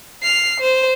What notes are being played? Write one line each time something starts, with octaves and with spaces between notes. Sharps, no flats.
F6 C7
C5